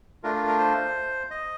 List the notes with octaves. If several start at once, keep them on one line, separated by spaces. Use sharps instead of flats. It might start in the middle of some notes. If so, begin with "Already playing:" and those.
A3 D4 F4 A#4
A#4
A#4
C5
D#5